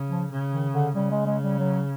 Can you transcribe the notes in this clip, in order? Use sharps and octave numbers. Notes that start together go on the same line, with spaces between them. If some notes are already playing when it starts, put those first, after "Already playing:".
Already playing: C#3
F3
C#3
D#3
D3
C#3 G3
G#3
G#3
G3
F#3